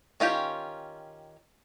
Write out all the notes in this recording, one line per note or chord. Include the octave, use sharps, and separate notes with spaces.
D#3 C#4 F4 G4